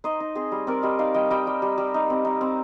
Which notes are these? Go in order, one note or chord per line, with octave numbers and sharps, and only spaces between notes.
D#4 C5 D#5
D#4
C4 G#4 C5
G3
C4 A#4 D5
G3 C5 D#5
D#4 D5 F5
G3 D#5 G5
G3 D#5 G5
G3
G3
G3
D#4
C4
D#4
C4